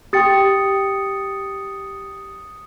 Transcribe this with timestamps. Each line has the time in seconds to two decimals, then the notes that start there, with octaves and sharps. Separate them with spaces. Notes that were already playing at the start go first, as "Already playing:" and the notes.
0.13 G4 G5 D#6 A6 C#7